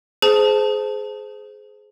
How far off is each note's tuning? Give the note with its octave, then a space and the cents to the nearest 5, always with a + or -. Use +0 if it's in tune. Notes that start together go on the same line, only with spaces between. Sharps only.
G#4 +25 C5 -20 A5 +0